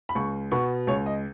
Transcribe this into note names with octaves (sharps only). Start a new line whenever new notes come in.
B5
C#2 C#6
B2 B3 C#6
C#2 C#5
D#5